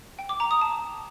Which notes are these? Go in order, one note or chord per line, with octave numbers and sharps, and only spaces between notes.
G5
D6
A#5
D#6
A5